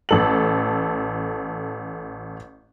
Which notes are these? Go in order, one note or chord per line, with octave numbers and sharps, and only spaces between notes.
A1 A4 F#7